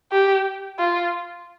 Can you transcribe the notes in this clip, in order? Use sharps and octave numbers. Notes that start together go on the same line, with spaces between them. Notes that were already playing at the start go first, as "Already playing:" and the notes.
G4
F4